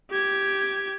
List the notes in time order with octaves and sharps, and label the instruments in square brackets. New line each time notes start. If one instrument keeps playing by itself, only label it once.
[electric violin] G4 G#6